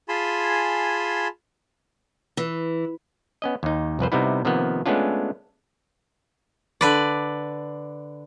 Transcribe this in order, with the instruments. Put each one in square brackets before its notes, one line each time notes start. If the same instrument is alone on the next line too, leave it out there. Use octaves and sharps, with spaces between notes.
[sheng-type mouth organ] F4 G#4 G#5 A5 B5 C6
[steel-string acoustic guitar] E3
[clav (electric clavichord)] B3 C#4 D#5
D#2 D#4
C2 F2 B4 C5
C3 G3 B3 D#4 E4
C3 D#3 F3 A#3 B3
G#3 A3 B3 C#4 D4 F4
[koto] D3 B4 D5